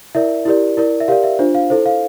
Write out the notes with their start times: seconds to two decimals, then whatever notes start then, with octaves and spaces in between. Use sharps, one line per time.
0.15 E4 A#4 D5 E5
0.46 E4 G4 A#4 D5
0.77 E4 A#4 D5
1.00 E5
1.08 G4 A#4 D5 F5
1.23 E5
1.39 D4 F4 C5
1.55 F5
1.70 E4 A4 C5
1.86 F5